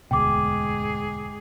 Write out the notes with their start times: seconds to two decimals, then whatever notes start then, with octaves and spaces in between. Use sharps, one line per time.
0.11 E1 D2 G#2 B2 G#4 G5 D6